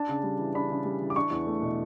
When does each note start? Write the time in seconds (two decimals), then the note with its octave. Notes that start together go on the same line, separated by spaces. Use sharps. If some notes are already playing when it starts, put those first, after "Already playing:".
Already playing: D4 A5
0.09 C#3
0.23 G3
0.39 E3
0.54 D4 B5
0.70 C#3
0.85 G3
1.00 E3
1.10 D6
1.16 D4 C#6
1.31 E2
1.47 A3
1.62 B2